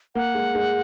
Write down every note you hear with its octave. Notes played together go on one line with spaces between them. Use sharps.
A#3 F#5
G#3
G#3